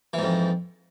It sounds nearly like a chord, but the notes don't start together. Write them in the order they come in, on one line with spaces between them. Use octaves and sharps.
E3 G#2 F2